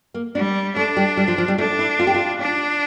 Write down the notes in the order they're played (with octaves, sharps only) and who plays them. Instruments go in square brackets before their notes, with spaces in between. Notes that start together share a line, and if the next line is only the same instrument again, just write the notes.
[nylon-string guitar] A#3
[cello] G3 [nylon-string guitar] D4
[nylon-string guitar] A3 [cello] D4
[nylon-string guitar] G3
G3
F3
F3
G3
[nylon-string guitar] A3 [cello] D4
[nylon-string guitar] E4
F4
G4
F4
[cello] D4